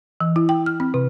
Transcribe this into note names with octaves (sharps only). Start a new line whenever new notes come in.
E3
E4
G5
F6
C4
C3